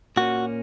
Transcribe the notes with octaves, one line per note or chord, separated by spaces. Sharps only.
A#2 A#3 C#4 F#4